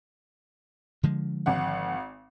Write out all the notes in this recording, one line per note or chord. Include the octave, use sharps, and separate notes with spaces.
D3 F3 G#3
G#1 F#5